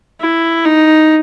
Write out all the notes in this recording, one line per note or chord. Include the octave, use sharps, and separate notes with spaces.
E4
D#4